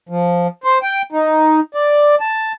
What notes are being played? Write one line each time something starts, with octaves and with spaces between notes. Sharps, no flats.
F3
C5
G5
D#4
D5
A5